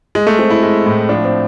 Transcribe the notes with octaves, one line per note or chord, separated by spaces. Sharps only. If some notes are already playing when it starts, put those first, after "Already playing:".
G#3
A3
G#3 C4
E4
G#3
A2
F3 D4
C4